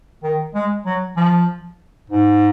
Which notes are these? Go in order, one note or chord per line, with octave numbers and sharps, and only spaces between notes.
D#3
G#3
F#3
F3
G#2